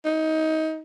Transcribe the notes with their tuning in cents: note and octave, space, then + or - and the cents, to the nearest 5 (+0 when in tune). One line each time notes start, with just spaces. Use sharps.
D#4 +25